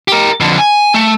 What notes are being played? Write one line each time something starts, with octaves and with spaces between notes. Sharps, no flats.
G4 A#4
F2 D3
G#5
A3